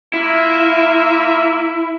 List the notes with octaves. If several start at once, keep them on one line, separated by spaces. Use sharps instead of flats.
A#3 E4 F4 E5